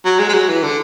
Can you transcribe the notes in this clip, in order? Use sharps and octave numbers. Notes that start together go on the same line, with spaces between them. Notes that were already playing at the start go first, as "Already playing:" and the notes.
F#3
G#3
G#3
F#3
E3
D3